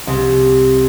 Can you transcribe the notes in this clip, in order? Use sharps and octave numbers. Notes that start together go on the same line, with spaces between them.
C2